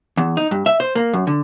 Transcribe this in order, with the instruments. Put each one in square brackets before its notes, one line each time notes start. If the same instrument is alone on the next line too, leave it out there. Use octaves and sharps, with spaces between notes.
[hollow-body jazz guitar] E2
D#4
G2
E5
C5
A#3
F#2
D3